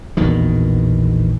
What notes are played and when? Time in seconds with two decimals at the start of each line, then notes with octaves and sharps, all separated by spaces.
0.17 A#1 E2 B2 D#3